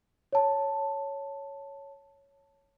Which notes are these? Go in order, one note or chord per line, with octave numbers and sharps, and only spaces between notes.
C#5 A5